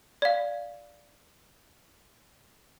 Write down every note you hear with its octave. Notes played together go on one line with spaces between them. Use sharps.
D5 F5